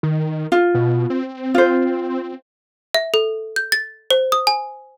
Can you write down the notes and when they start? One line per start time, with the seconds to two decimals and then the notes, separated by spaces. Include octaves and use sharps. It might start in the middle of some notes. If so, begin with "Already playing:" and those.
0.03 D#3
0.52 F4
0.74 B2
1.10 C4
1.55 F4 C5
2.95 E5
3.14 A4
3.56 G6
3.72 A6
4.11 C5
4.32 D#6
4.47 G#5